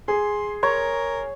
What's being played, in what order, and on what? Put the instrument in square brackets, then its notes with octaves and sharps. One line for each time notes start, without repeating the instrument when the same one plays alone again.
[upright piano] G#4 [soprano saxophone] C6
[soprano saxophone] A#4 [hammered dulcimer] C#5 C#6